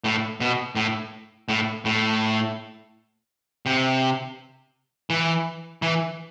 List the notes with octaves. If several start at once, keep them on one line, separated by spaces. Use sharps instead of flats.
A2
B2
A2
A2
A2
C3
E3
E3